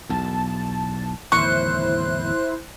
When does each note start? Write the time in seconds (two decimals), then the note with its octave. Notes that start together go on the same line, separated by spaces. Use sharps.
0.09 B1 E2 A5
1.32 D1 E2 D#3 E4 C5 C#6 F#6